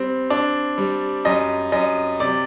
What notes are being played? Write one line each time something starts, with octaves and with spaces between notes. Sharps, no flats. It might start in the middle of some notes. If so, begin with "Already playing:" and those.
Already playing: G3 C4
D4
G3
F#2 D#5
F#2 D#5
C3 D5